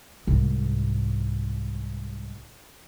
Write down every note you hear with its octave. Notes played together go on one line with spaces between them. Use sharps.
C2 G#2